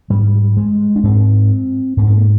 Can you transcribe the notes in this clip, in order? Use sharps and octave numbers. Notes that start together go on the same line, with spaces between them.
G#2 G3
G#3
D4
G#2 C4
G#2 A#3
C4
A#3